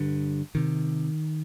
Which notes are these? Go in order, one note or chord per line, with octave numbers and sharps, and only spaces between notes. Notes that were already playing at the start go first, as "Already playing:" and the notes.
Already playing: G2 D3
C3 D#3